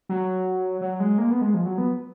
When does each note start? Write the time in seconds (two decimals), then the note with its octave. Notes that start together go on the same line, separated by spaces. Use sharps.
0.09 F#3
0.81 F#3
1.00 G#3
1.18 A#3
1.31 B3
1.41 G#3
1.54 F3
1.66 F#3
1.78 B3